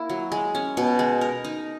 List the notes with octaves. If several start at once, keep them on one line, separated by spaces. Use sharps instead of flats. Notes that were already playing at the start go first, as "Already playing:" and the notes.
Already playing: A#3 E4
F#3
G#3
C#4
B2
G#3
A#4
D#4